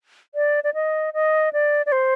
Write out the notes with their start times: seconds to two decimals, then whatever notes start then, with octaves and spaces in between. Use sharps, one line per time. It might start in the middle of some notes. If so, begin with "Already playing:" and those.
0.35 D5
0.64 D5
0.74 D#5
1.14 D#5
1.53 D5
1.86 D5
1.92 C5